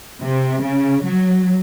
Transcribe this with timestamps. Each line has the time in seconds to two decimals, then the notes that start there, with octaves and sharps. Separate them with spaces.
0.22 C3
0.62 C#3
1.03 F#3